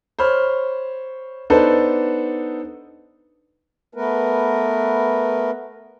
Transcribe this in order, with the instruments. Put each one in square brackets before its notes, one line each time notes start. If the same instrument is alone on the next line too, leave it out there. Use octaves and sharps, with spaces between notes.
[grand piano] C5 C#5 B5 F6
B3 D4 D#4 A4 B4 C5
[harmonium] A3 B3 A#4 B4